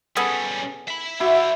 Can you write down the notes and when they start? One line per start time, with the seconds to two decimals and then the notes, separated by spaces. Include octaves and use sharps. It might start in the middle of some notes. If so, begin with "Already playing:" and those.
0.16 G3 B3 C#4 G#4 A4
0.88 E5 B5
1.20 E4 F#4 C5 D5 E5